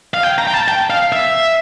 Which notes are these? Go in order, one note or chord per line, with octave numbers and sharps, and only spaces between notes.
F5
G5
A#5
G5
A5
G5
F5
E5